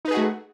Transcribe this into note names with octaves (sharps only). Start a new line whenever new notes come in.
A3 D#4 F#4 G#4 B4